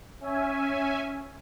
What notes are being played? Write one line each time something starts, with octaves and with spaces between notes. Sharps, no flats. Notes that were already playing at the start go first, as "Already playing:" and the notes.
C#4 E5 G#5